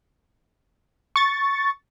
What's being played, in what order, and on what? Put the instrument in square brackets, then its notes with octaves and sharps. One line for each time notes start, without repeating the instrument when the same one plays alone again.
[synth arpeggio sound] C#6 A6